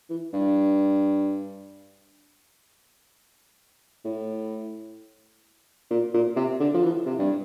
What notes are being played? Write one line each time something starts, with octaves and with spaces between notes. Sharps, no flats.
E3
G2
A2
A#2
A#2
C3
D3
F3
E3
C3
G2